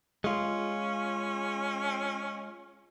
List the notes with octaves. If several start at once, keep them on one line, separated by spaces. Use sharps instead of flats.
G#3 C#4 F4